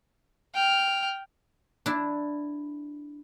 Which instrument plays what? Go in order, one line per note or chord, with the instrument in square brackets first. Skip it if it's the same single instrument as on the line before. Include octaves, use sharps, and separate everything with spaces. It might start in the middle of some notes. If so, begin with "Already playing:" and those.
[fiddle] G5 F6
[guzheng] D4 E4